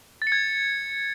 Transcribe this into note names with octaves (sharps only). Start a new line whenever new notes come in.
A6
C#7
G#6